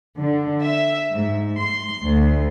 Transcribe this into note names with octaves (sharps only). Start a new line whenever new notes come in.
D3
E5
G#2
C6
D2